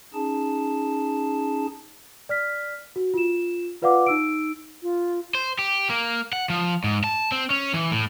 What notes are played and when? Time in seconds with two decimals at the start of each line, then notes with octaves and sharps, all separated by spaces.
0.14 C#4 D#4 G#4 A5
2.29 D5 F6 B6
2.96 F#4
3.14 F4 E7
3.82 F4 B4 D5 F5 F#5 D6
4.06 D#4 E6 D7
4.83 F4
5.35 C5
5.59 G4
5.90 A#3
6.33 F#5
6.50 F3
6.84 G#2
7.04 A5
7.32 C4
7.50 C#4
7.74 E3
7.91 A2